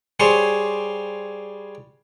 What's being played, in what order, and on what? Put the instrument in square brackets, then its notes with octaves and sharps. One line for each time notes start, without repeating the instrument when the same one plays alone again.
[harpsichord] G3 G#4 C5 C#5